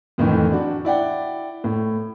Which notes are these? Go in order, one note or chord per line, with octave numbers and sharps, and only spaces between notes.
F2 A2 D#3 E3
D4 F#4
E4 D5 F#5 G5
A2